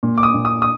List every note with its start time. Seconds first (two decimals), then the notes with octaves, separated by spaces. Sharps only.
0.03 A#2
0.18 D6
0.23 D#6
0.34 A#2
0.45 D#6
0.62 D#6